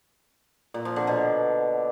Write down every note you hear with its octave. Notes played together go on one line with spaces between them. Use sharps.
A#2
F3
D3
B2